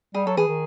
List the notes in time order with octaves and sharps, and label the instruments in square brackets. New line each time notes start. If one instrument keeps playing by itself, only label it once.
[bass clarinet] G3 [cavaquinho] G#4
[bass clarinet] F#3 [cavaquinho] A4
[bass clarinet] E3 [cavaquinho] G#4
[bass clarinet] D#3